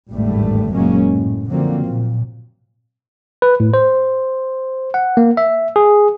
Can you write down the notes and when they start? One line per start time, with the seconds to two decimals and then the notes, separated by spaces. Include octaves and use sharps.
0.13 G#1 E2 A2 D3 G3 A3
0.72 F#1 A#2 F#3 G#3 A#3 C#4
1.10 A2
1.48 D3 F3 F#3 A#3 C4
1.85 A#2
3.42 B4
3.60 A2
3.74 C5
4.94 F#5
5.17 A#3
5.37 E5
5.76 G#4